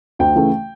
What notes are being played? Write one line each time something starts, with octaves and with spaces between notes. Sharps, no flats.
D2 G5
C#3 E3 A3